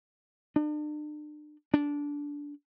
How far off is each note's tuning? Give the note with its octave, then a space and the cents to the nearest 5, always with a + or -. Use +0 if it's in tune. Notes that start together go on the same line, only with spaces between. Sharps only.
D4 +40
D4 -15